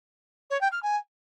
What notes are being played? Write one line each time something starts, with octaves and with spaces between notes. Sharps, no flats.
C#5
G5
F6
G#5